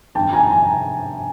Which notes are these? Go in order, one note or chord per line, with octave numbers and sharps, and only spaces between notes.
G2 D#3 G5 A5
G#5 A#5
G#5 A#5